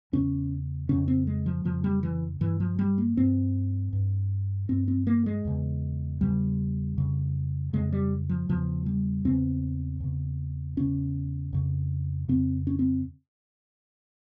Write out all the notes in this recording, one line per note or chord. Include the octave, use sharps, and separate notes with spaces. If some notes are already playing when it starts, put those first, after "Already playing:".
E2 C#3 C#4
F2 C#3 C#4
C4
G#3
F3
F2 C#3 F3
G3
E3
G2 E3
F3
G3
A#3
G2 C4
G2
G2 C4
C4
A#3
G#3
E2 C#3
E2 C#3 G3
F2 C#3
F2 C#3 G#3
G3
F3
E2 C#3 F3
G3
E2 C#3 C4
E2 C#3
E2 C#3 C#4
F2 C#3
F2 C#3 C4
C#4
C4